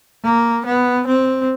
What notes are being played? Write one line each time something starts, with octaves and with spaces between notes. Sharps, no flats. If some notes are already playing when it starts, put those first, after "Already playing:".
A#3
B3
C4